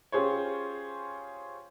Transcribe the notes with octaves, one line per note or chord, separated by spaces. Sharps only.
C#4 F4 G4 G#4 C5 C#5